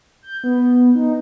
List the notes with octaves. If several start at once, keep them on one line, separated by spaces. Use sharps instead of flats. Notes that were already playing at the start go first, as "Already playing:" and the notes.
G6
B3
D#4